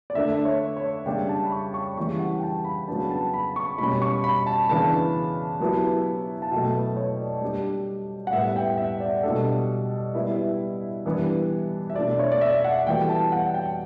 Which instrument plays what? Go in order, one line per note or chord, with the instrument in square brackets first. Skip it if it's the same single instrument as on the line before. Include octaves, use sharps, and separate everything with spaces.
[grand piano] D5
[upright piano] D3 A3 D4 [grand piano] E5
[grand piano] C#5
C#5
[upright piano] C#3 G3 D4 [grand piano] G5
[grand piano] A5
B5
C#6
C#6
[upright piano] C#3 E3 G3 [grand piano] C#6
[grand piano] F#5
G5
A5
B5
[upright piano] C#3 F#3 B3 D4 [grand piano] A5
[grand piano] A5
B5
C#6
[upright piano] B2 G3 C#4 [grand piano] B5
[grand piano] C#6
B5
A5
[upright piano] C#3 E3 B3 D4 [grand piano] A5
[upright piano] F#3 B3 E4 G4
[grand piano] A5
[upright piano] B2 F#3 A3 [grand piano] G5
[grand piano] B4
C#5
D5
[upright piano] G3 D4 G4
[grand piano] F#5
[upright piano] A2 G3 B3 [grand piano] E5
[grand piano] G5
E5
D5
[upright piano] B2 G3 D4 A4
[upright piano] G3 B3 E4 [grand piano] E5
[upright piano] E3 G3 B3 D4
[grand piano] E5
[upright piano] B2 A3 D4 [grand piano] D5
[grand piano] C#5
D5
E5
F#5
[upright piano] E3 G3 B3 F#4 A4 [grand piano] G5
[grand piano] A5
F#5
G5